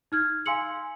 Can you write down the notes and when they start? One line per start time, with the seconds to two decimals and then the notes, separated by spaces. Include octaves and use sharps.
0.12 D#4 F6 G#6
0.46 F5 G#5 C6 E6 C#7 F#7